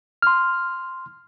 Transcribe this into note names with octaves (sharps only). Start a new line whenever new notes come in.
C6 F6